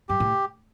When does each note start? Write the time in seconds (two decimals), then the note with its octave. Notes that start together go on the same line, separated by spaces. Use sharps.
0.09 G2 G4
0.20 A2